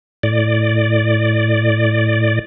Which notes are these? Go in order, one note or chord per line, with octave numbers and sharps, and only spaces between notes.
A2 D5